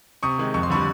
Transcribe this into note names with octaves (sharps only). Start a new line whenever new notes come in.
C3 C#6 D#6
D#3 G#3
F2 C#6
C6
D3 G3 B5 C#6